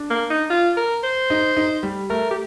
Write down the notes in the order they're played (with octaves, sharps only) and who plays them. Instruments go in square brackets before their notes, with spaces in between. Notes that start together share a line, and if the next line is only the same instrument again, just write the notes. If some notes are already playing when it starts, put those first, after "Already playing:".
Already playing: [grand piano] D4
[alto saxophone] A#3
D#4
F4
A#4
C5
[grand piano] D#4
D#4
G3
[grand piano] A3 [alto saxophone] A#4
[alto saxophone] G4